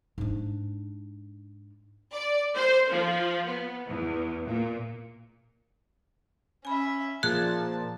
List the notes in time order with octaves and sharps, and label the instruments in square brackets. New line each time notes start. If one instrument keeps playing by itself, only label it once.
[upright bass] G#2 D4
[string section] D5
C5
F3
B3
E2
A#2
[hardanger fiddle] C#4 E5 [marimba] G#5 B5
[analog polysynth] A#2 F3 A#3 [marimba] G#4 [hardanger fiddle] A5 [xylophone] F#6